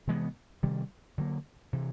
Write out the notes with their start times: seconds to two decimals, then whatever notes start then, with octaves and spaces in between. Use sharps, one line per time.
0.07 C3 E3 G#3 B3
0.63 C3 D#3 G3
1.18 D3 F#3 A#3
1.73 C3 E3